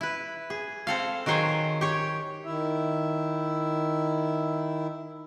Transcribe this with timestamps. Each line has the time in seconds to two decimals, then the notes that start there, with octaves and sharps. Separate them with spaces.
0.01 E4 B4
0.50 G#4
0.87 C4 A4 F5
1.26 D#3 F#3 G#4 C5 C#5
1.81 G4 C#5
2.46 D#3 E4 E5